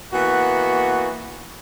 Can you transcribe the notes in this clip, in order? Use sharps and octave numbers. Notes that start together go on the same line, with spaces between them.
E3 A#3 B3 F#4